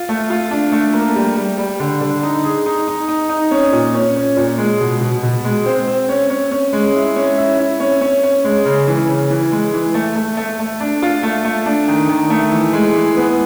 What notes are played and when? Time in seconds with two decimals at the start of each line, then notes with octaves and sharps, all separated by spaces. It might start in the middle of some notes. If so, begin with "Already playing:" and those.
Already playing: F4
0.09 A3
0.30 F4
0.51 D4
0.72 A3
0.93 A#3
1.16 G3
1.37 G3
1.58 G3
1.80 D3
2.01 D3
2.23 D#4
2.44 G#4
2.66 D#4
2.88 D#4
3.08 D#4
3.29 D#4
3.51 C#4
3.72 A#2
3.94 C#4
4.16 C#4
4.36 A#2
4.58 G#3
4.81 B2
5.01 B2
5.23 B2
5.45 G#3
5.65 C4
5.87 C4
6.09 C#4
6.30 C#4
6.51 C#4
6.73 G#3
6.95 E4
7.16 C#4
7.38 E4
7.59 E4
7.80 C#4
8.01 C#4
8.24 C#4
8.45 G#3
8.65 C#3
8.87 E3
9.09 C#3
9.30 E3
9.52 G#3
9.74 E3
9.94 A3
10.15 A3
10.37 A3
10.59 A3
10.80 D4
11.02 F4
11.23 A3
11.45 A3
11.66 D4
11.88 D#3
12.09 D#3
12.30 A3
12.51 E3
12.73 G#3
12.95 E3
13.17 B3